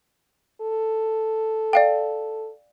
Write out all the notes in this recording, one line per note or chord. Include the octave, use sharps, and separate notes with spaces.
A4
D5 F5 G5